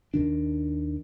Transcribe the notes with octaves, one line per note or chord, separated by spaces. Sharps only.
D#2 D#3 D4